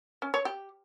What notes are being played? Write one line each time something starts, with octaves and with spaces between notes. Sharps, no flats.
C#4
C#5
G4